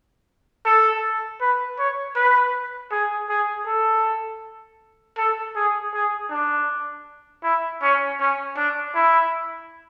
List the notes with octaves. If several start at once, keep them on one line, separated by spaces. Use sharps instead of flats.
A4
B4
C#5
B4
G#4
G#4
A4
A4
G#4
G#4
D4
E4
C#4
C#4
D4
E4